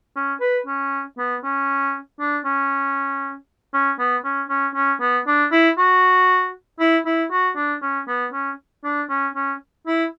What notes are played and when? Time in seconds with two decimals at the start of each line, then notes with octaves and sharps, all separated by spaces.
0.16 C#4
0.40 B4
0.66 C#4
1.18 B3
1.43 C#4
2.20 D4
2.45 C#4
3.73 C#4
3.99 B3
4.24 C#4
4.49 C#4
4.75 C#4
5.01 B3
5.27 D4
5.52 E4
5.78 F#4
6.80 E4
7.06 E4
7.31 F#4
7.56 D4
7.82 C#4
8.08 B3
8.33 C#4
8.84 D4
9.09 C#4
9.35 C#4
9.87 E4